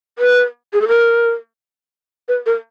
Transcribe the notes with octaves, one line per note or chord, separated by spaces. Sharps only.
B4
G#4
A4
A#4
B4
A#4